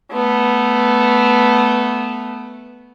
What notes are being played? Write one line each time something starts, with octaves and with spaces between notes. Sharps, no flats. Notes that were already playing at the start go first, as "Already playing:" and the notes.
A3 B3